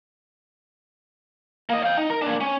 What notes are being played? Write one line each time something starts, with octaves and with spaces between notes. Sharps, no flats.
A#3 D#5
F5 G5
D#4
A#4
A#3 D4
C#4